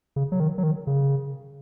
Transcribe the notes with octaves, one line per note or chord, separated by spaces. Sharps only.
C#3
F#3
D#3
F#3
D#3
C#3